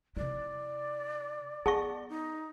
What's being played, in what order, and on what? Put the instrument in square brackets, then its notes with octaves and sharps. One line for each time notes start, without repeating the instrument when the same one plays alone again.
[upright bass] C3 E4 [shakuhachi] D5
[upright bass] B3 [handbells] G#4 F#5 A#6 [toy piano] A5 C#6
[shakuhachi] D#4